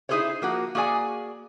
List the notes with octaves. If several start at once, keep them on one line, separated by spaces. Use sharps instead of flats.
D#4 E4 G#4 A4 C5 C#5
F3 A#3 F#4
A#3 F#4 G#4 D5 G#5